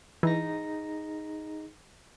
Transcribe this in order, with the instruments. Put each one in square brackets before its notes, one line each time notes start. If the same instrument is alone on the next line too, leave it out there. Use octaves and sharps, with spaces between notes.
[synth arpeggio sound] E3 [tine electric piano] D#4 G#4 A#6